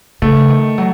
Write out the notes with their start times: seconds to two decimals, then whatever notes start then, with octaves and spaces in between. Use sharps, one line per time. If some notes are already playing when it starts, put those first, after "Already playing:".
0.22 C#3 A3
0.50 D#3
0.78 F#3